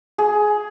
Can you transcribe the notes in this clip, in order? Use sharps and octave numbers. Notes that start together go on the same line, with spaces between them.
G#4